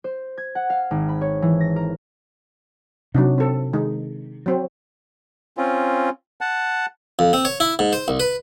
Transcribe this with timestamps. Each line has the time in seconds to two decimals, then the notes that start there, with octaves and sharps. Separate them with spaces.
0.04 C5
0.38 G#6
0.55 F#5
0.70 F5
0.91 G#1
1.09 B5
1.21 C#5
1.42 E3
1.60 A#6
1.76 A#4
3.14 C3 F#3 D4 D#4
3.38 C4 A4
3.73 D#3 G#3 D#4
4.46 F#3 C4
5.58 C4 C#4 F4
6.41 F#5 A5
7.19 F2
7.33 C4
7.45 C#5
7.60 E4
7.79 G#2
7.93 C5
8.08 C2
8.20 B4